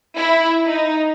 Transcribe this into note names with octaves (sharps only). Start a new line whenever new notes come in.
E4
D#4